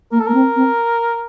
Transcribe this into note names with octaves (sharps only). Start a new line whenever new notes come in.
A#3 A#4
A4
A#3 A#4
C4
C4